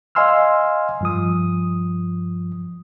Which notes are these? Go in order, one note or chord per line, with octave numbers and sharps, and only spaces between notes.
D#5 F5 G#5 C6 E6 F6
G2 F3 D#6